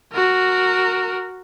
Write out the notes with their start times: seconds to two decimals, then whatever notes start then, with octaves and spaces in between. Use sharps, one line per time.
0.13 F#4 A#4